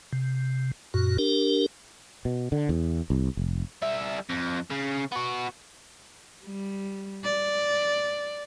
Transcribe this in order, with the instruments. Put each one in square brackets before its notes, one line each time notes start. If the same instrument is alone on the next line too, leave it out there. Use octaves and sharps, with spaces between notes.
[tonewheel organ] C3
F#2 A#2 F#4
D4 G4 A#4
[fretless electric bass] B2
D3
E2
C2
F1
[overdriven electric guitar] G3 E5
F2
C#3
B3 F#4
[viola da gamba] G3
D5